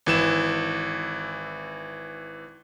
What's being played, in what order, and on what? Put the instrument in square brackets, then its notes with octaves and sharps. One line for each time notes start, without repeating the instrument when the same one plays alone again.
[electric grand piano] G#1 E3 E7